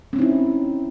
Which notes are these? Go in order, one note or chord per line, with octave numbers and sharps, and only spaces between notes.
C4 C#4 D#4 E4